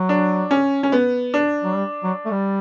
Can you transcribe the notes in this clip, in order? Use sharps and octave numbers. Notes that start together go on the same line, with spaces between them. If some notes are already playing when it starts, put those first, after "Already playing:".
Already playing: F#3
D4
C#4
C#4
B3
D4
F#3
G3
F#3
A3
G3